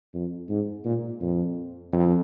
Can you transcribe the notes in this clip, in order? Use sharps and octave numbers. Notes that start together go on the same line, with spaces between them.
F2
G#2
A#2
F2
F2